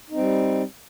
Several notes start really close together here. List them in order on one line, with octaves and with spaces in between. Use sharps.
D#4 C4 G3